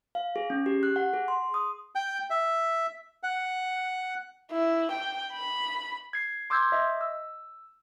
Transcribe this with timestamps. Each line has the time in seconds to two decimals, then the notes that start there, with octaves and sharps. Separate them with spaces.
0.15 F5
0.36 G#4
0.50 C#4
0.66 G4
0.83 F#6
0.96 F#5
1.14 G#4
1.28 C6
1.54 D#6
1.95 G5
2.30 E5
3.23 F#5
4.52 E4
4.91 G5
5.33 B5
6.13 G#6 C7
6.50 C6 D6 E6 G6 G#6
6.72 D#5 E5
7.01 E6